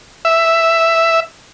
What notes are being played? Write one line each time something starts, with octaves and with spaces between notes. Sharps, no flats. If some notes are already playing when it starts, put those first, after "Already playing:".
E5